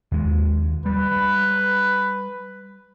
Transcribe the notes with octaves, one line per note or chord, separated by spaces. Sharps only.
D#2 G#3
G3 B4